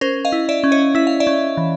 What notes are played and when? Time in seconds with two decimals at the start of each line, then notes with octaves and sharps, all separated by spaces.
0.01 C#4 A#4 C5
0.25 D#5 F5
0.32 E4
0.49 D5 E5
0.64 C#4
0.72 C#5 D#5
0.95 E4 E5
1.07 F5
1.20 D5 E5
1.27 C#4
1.57 E3